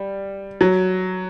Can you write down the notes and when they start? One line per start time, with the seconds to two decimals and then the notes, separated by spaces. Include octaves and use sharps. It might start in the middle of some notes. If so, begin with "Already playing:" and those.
Already playing: G3
0.61 F#3